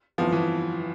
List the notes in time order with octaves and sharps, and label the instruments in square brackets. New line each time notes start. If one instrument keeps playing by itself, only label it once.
[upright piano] G1 F2 E3 B3 [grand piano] F3
[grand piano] E3